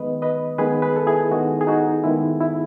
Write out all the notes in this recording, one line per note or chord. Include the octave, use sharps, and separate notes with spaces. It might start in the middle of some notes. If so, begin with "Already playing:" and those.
Already playing: D#3 G#3 B3 B4 D#5
B4 D#5
D#3 G#3 B3 G#4 B4
G#4 B4
A4
E4 G#4
D#3 G#3 B3 D#4 F#4
G#4
D#4 F#4
D#3 G#3 B3 E4
E4